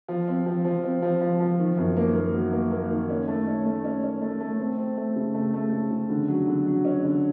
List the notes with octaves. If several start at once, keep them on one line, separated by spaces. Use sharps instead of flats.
F3
C4
F3
F3
C4
F3
F3
F3
D#3
F#2
A#3
A#3
F#3
A#3
A#3
D#3
C#4
A3
C#4
A3
C#4
C#4
A3
A3
C4
C4
A3
C#3
A3
A3
C#3
C#3
D3
F#3
D3
F#3
C#4
D3